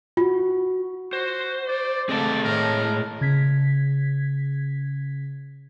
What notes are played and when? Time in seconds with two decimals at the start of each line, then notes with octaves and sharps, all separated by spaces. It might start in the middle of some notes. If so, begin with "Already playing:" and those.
0.17 F4 F#4
1.13 F#4 C5
1.67 D5
2.09 A3 C4 G#4 D5 D#5 A5
2.44 A2 A#4
3.21 C#3 G#6 B6